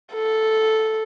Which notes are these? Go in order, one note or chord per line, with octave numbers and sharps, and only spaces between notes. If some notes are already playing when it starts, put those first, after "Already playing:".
A4